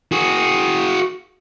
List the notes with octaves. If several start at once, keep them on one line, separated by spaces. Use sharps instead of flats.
F#4 G#4